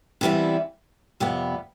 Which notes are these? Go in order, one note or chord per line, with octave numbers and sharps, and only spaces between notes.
C3 E3 G3 B3 E4
F2 C3 G3 B3